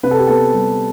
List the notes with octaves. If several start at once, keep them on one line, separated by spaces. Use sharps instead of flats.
C3 B4
A4
G4
B3 A4
G3